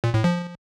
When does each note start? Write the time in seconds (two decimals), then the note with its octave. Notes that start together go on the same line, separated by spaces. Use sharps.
0.04 A#2
0.14 A2
0.24 F3